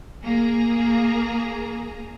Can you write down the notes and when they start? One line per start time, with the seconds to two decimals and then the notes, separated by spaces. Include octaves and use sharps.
0.23 A#3 G#4 A#5